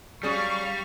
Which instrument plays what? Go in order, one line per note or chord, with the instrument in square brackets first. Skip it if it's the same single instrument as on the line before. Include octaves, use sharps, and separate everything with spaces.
[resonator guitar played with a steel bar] F#3 C#4 G#4 [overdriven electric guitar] G3 [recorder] D5 [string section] F5 C#6